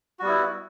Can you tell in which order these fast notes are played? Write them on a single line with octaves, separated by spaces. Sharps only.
F#4 G3 B3 E4